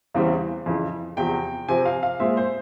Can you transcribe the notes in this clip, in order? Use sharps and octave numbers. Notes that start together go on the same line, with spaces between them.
E2 C#3 E3 G3 C4 F5
F2 C#3 E3
E2 C3 F3 G5
C3 F3 C4 G#5
F5
F5
A#2 G#3 C4 E5
C5